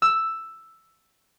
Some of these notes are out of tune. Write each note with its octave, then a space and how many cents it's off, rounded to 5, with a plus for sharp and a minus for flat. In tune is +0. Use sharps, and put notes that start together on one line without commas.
E6 +5